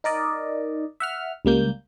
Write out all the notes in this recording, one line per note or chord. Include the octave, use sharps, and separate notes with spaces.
D#4 A#4 D5 D#5
E5 F#5 F6
C#2 G3 A#3 G6